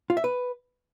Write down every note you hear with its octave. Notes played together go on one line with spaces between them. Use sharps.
F4
E5
B4